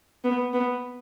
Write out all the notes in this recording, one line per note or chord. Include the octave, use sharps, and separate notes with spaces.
B3
B3